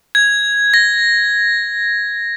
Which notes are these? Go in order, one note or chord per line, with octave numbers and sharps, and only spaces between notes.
G#6
A#6